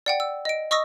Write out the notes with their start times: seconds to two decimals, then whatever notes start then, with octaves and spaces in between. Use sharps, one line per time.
0.06 D5 F#5 G5
0.20 E6
0.45 D#5 D7
0.71 D#5 C#6 D#6 E6 A#6